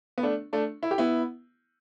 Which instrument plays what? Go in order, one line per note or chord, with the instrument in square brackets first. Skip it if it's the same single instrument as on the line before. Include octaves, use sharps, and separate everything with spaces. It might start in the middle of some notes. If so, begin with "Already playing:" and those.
[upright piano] B3
A3 D4
A3 D4
E4
G4
B3 E4